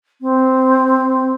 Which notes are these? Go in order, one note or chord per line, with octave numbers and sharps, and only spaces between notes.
C4